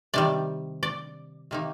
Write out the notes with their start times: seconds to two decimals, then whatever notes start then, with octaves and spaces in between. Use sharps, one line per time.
0.14 C3 D#3 G3 D5
0.83 D5
1.51 C3 D#3 A#3 D#4